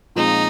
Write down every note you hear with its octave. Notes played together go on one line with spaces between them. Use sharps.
A#2 F3 G#3 C4 D#4